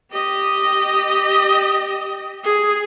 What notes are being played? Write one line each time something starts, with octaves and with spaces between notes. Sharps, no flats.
G4 D#5
G#4